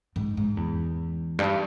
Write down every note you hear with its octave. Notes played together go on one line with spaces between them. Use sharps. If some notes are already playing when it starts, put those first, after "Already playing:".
G#2
G#2
E2
G2